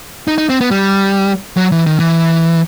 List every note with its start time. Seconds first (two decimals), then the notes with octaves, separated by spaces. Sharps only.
0.28 D#4
0.38 D#4
0.49 C4
0.61 B3
0.71 G3
1.57 F#3
1.72 E3
1.86 D#3
2.00 E3